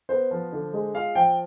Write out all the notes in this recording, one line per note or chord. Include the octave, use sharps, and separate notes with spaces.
B3 C5
F3
D3
G#3
F4 F5
F3 G5